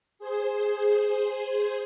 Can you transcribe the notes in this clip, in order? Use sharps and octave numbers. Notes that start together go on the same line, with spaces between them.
G#4 C5